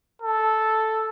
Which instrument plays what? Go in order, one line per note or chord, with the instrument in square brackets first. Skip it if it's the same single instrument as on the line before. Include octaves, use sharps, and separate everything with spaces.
[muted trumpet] A4